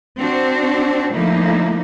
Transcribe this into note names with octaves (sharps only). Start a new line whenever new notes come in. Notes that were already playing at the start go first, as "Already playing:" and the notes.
C4 D4 F#4 C5
D3 F3 A3 A#3 D#4 E4